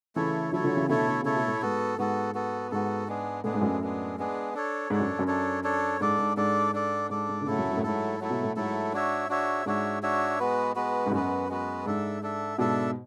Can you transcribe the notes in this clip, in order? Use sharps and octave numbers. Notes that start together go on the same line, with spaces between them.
C#3 E3 A3 E4 A4 C#5
D3 F#3 A3 E4 A4 C#5
D3 F#3
C#3 E3
B2 D3 A3 E4 A4 C#5
D3
C#3 A3 E4 A4 C#5
B2
A2
G#2 B3 F#4 A4
G#2 B3 F#4 A4
B3 F#4 A4
G#2 B3 F#4 A4
G#3 B3 D4 G#4
A2 G#3 B3 D4 G#4
G#2
F#2 A2
G#3 B3 D4 G#4
G#3 B3 D4 G#4
D4 A4 C#5
G#2 D4 A4 C#5
F#2
F#2
D4 A4 C#5
D4 A4 C#5
G#2 D4 A4 D5
G#2
G#2 D4 A4 D5
D4 A4 D5
G#2 D4 A4 D5
G#2
D3
A2 C#3 F#3 A3 E4 A4
F#2 A2
F#2
A2
G#2 F#3 A3 E4 A4
F#3 A3 E4 A4
B2
A2
G#2 F#3 A3 E4 A4
D4 F#4 C#5 E5
D4 F#4 C#5 E5
G#2 D4 F#4 C#5 E5
D4 F#4 C#5 E5
G#3 B3 F#4 B4
G#3 B3 F#4 B4
G#2
F#2 G#3 B3 F#4 B4
G#3 B3 F#4 B4
G#2 D4 A4 E5
D4 A4 E5
G#2 B2 D4 A4 E5